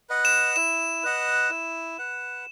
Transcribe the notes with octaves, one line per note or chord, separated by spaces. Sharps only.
B4 D#5 F#5
E7
E4 E7
B4 D#5 F#5
E4
B4 F#5